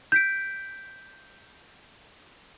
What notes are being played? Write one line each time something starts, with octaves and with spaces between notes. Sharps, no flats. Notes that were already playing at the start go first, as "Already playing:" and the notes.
G6 B6 D7